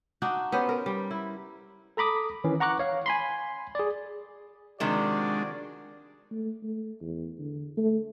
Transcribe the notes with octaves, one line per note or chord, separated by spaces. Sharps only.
D4 D#4 F#4
B3 C#4 G4 C5
A#4
G3
E4
A4 A#5 B5 D6 D#6
D#3 E3 C#4
F#5 A#5 C#6 D6 F#6
C#5 F5
G#5 B5 C6
G#4 D5
C3 D#3 F3 G#3 D4 F#4 D5
A3
A3
E2
D3
A3